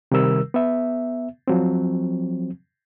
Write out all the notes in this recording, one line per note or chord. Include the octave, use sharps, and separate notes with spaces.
C3 D#3 G3 A#4 E6
B3 E5
F3 F#3 C4